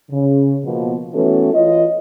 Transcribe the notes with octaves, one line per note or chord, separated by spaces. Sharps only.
C#3
B2 F3 A#3 B3
E3 A3 B3 C#4 F#4 A4
E3 F4 C#5 D#5